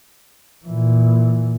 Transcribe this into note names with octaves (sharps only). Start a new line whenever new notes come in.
A#2 E3